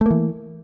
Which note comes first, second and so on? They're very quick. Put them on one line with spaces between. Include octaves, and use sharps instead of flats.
A3 A#3 E3